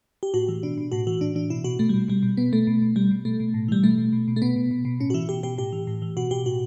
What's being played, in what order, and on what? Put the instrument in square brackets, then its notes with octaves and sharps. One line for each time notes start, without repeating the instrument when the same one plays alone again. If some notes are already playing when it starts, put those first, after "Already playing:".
[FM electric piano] G4
A2 F#4
E3
B2 D4
B2
A2 F#4
E3 F#4
A2 D4
E3 D4
B2 E4
B2 F#4
B2 A3
B2 G3
B2 G3
B2
B2 B3
B2 A3
B2
B2
B2 G3
B2
B2 A3
B2
A2
E3 G3
B2 A3
B2
B2
B2
A3
B2 B3
B2
B2
B2
A2 C#4
F#4
E3 E4
B2 G4
B2 G4
A2 G4
E3
A2
E3
B2 F#4
B2 G4
A2 F#4